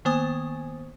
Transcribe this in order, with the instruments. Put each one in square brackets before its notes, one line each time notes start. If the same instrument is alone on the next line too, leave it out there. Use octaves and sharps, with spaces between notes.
[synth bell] D#3 A#3 B3 C5 G#5 D#6